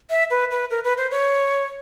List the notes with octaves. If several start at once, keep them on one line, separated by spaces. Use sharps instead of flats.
E5
B4
B4
A#4
B4
C5
C#5